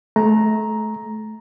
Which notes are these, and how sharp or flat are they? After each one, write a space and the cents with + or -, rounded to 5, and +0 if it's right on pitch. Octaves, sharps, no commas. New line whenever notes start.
A3 -30 A#5 +5